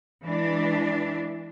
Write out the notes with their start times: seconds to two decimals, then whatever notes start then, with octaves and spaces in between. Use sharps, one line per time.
0.25 E3 G#3 D4